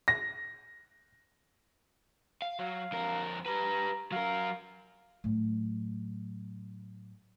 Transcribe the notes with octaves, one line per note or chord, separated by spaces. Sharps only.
A#6
F5
F#3 F5
F2 A#4
G3 B4 A#5
F#3 A#4 F5
A2 F#3